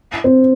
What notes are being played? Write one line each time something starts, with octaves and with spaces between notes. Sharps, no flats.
C4